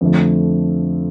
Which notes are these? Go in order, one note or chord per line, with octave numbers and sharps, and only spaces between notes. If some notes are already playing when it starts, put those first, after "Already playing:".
F2 D3 F3 A3